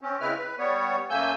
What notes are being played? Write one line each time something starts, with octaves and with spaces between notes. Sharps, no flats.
C4 C#4
C#3 G#3 C4 E4 B4 F6
B4
G3 B3 C#5
F#2 A3 A#3 G#5 E6 G6